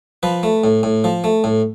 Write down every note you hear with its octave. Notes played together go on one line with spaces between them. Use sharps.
F3 B4
A3
A2
A2
F3
A3
A2